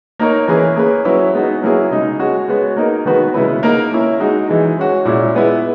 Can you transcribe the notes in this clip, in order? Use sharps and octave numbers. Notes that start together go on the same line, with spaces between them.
A#3 D#4 A#4 C#5
E3 A#3 C#4 G#4 B4
A#3 C#4 G#4 B4
F#3 C#4 E4 B4
G#3 B3 D#4 F#4
F#3 A#3 C#4 E4 G#4
C#3 G#3 D#4
G#3 C#4 F#4 C#5
G#3 B3 F#4 C#5
A#3 D#4 A#4
D#3 G#3 B3 F#4 B4
C#3 G#3 B3 E4 B4
A#3 D#4 A#4
A#3 C#4 E4
G#3 D#4 F#4
E3 G#3 D#4
G#3 C#4 F#4
A#2 G#3 C#4 E4
G#3 B3 E4